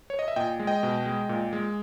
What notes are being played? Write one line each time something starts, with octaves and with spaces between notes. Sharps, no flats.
C#5
D#5
E5
A#2 D#5 G5
G#3
D#5 G5
B2
G#3
A#2
G#3